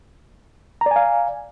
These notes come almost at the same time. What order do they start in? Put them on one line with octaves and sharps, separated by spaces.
A#5 D5 G#5 F5